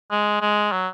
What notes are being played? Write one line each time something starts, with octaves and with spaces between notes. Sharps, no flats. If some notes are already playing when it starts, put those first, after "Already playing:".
G#3
G#3
F#3